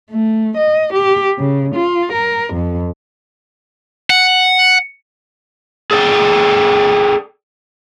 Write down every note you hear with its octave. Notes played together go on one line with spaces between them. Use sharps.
A3
D#5
G4
C#3
F4
A#4
F2
F#5
G#4 A4 D5 G5